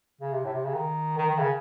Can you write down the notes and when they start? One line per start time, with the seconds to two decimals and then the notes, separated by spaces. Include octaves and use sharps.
0.21 C#3
0.32 C3
0.44 A2
0.53 C3
0.64 C#3
0.74 D#3
1.18 D#3
1.29 D#3
1.38 C#3